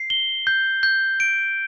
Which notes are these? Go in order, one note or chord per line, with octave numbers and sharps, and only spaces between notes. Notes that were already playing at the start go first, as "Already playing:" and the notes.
Already playing: C7
G7
G6
G6
D7